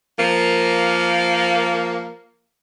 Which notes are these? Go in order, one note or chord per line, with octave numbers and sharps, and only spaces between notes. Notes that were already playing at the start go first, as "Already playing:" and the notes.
F3 A#3